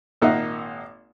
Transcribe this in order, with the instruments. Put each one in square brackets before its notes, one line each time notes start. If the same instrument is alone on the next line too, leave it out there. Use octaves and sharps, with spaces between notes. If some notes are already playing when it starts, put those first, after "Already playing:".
[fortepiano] G#1 A#2 A#3 D#4 E5 F#5